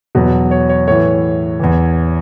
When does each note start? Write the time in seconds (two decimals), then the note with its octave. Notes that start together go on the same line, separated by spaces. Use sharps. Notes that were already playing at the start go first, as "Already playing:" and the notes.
0.15 E2 B2 F#3
0.51 C#5
0.69 C#5
0.87 A2 E3 C#5
1.59 E2 E3